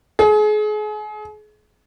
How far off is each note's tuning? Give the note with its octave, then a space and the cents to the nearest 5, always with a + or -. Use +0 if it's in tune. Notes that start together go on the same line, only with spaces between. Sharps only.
G#4 +35